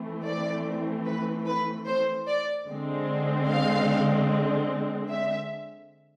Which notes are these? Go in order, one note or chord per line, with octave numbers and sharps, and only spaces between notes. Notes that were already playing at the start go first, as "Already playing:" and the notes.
Already playing: E3 A3 C4
D5
B4
B4
C5
D5
D3 G#3 C4
F5
E5